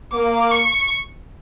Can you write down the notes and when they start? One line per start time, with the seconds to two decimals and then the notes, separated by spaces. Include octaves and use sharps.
0.13 A#3 D6
0.52 C#6